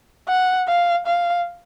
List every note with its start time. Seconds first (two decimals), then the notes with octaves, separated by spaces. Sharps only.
0.28 F#5
0.68 F5
1.06 F5